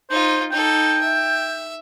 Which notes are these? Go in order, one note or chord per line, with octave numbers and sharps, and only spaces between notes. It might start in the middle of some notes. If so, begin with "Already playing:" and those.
D#4 F4 C5
D#4 A4 G5
E5